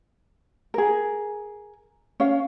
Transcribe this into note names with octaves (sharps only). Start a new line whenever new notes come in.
G#4 A#4
C#4 F5